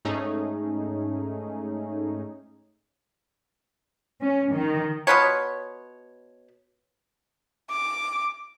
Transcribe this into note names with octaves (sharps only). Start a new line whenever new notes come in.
G#2 A3 C#4 D#4 G#4
C#4
D#3
B2 F4 B4 C#5
D6